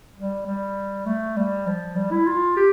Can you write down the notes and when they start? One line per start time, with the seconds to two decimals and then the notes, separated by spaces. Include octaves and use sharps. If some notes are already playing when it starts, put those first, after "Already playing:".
0.17 G3
0.46 G3
1.06 A3
1.37 G3
1.67 F3
1.96 G3
2.11 E4
2.27 F4
2.56 G4